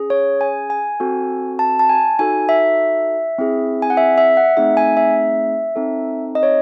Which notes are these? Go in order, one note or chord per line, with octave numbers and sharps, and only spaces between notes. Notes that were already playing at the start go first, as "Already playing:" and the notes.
Already playing: C#4 G#4
C#5
G#5
G#5
C4 F#4 A4
A5
A5
G#5
D#4 F#4 A4 G#5
E5
C4 E4 G#4
G#5
F#5
E5
E5
F#5
A3 C4 D#4 G#4 E5
G#5
E5
C4 D#4 A4
D#5
C#5